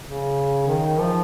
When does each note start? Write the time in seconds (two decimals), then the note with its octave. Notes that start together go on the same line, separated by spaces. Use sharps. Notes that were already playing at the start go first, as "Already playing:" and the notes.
0.04 C#3
0.68 D#3
1.00 F3